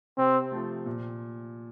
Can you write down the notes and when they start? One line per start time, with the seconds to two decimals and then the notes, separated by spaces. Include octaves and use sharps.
0.18 C3 C4
0.52 F3 A3
0.86 A#2